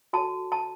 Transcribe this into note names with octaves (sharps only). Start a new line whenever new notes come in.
F#4 A4 C#5 A5
A5